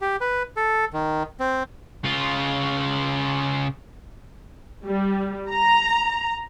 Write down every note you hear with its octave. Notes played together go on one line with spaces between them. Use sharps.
G4
B4
A4
D#3
C4
C#3 F4
G3
A#5